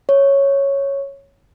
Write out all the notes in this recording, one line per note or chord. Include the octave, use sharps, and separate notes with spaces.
C#5